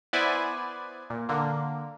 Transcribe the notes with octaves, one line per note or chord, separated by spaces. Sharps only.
B3 E4 B4 C5 D5 G#5
A#2
D3 A#3